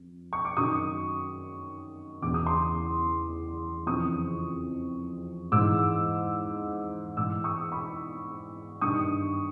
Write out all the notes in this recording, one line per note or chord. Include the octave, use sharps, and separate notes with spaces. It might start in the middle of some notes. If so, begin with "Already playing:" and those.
Already playing: F2
C#6
D6
F#2 D#3 C#6 D#6
E2 C#3 E3 D6
D#6
C6 D6
F2 C#3 E3 C#6 D#6
G#2 E3 D6 E6
G#2 E3 D6 E6
C#6 D#6
B5 C#6
G2 D#3 C#6 D#6